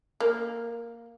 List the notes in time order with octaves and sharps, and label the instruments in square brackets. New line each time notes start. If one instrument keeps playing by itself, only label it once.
[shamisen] A#3